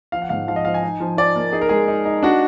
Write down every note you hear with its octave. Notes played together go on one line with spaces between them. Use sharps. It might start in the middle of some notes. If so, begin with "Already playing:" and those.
F3 F5
F#5
G#2 F5
F3 F5
D#5
F3 F5
G#5
D#4
F3
F3 D5
A#3
D#4 G#4
A#4
G#3 G#4
D#4
D#4
D4 F#4